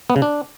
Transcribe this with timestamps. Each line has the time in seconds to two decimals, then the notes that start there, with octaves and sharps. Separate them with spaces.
0.10 B3
0.16 C#3
0.22 D4